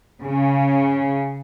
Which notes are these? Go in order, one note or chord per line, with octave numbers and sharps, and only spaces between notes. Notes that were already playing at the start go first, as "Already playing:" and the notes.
C#3